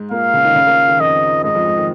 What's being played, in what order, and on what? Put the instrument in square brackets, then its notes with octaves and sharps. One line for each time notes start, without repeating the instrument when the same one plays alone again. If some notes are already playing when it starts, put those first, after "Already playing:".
Already playing: [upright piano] G#2 G#3
[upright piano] A#2 A#3 [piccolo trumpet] F5
[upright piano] C#3 C#4
D#3 D#4
C#3 C#4
A#2 A#3
D#3
[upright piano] F2 F3 [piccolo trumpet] D#5
[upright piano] G#2 G#3 [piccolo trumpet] D#5
[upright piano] F2 F3
G#2 G#3
D#3